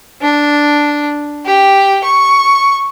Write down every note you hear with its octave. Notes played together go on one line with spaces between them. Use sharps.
D4
G4
C#6